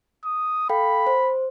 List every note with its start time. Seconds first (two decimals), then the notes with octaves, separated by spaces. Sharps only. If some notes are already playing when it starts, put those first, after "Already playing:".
0.24 D#6
0.69 A4 F5 G5 B5
1.07 C5